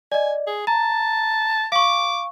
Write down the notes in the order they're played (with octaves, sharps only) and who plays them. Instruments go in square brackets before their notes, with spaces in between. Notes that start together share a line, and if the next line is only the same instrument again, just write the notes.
[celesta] D5 D#5 [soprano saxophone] G#5
[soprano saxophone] G#4
[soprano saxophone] A5 [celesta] A#5
[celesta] F5 C#6 [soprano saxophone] D6